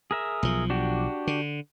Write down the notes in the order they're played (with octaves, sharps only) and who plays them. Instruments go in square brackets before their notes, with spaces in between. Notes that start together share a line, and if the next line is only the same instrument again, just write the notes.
[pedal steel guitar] G#4 A#4 E5
[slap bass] B1 F3
[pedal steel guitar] D4 F#4 G4
[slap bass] D3